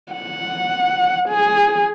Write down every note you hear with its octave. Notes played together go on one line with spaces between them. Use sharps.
F#5
G#4